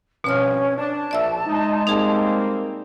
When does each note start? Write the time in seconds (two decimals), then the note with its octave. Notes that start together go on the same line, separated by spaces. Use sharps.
0.24 C2 G2 B2 F3 C#4 C#5 F6
0.77 D4 A5
1.11 A#1 D5 E5 E6
1.45 G#3 D#4
1.87 G3 A#3 C4 D#4 G#4